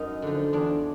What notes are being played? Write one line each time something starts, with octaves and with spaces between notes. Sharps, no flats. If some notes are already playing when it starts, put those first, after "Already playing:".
Already playing: F#2 D#4
D3 F3
E2 D4